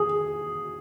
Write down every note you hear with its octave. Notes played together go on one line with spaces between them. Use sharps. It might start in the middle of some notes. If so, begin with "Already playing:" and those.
Already playing: G#4